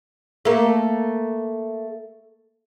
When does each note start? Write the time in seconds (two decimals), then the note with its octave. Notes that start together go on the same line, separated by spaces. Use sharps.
0.45 A3 A#3